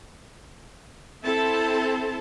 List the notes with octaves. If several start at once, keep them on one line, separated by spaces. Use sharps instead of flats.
C4 E4 A4 A5